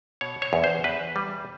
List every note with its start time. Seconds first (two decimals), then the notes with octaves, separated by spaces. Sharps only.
0.21 B2 C#5
0.42 C#5
0.53 E2
0.64 C5
0.84 E2 B4
1.16 G3